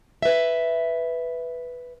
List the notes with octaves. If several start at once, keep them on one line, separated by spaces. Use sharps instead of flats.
B4 E5